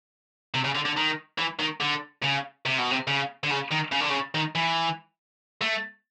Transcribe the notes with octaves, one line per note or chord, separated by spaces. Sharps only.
C3
C#3
D3
D3
D#3
E3
D#3
D3
C#3
C3
B2
C3
C#3
D3
C#3
D#3
C#3
D3
C#3
D#3
E3
A3